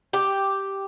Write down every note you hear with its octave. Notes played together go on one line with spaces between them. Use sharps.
G4